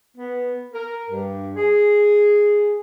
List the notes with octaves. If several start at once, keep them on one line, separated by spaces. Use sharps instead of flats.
B3
A#4
G2
G#4